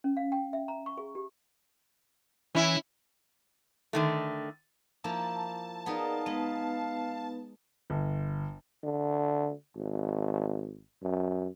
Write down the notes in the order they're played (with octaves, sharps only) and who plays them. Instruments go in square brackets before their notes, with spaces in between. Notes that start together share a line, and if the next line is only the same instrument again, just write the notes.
[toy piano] C#4
F5
G5
E5
A#5
C#6
G#4
G4
[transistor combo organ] E3 [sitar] C#4 E4
[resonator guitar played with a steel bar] D3 D#3 A3
[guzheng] F3 A#3 E4 [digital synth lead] A5
[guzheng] B3 D#4 [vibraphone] G#4 A#4 D5 [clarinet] F5
[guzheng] G#3 [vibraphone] B3 D#4 B4
[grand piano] G1
[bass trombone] D3
G#1
F#2